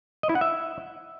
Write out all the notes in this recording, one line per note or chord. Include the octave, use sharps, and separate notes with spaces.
D#5
E4
F#5
E5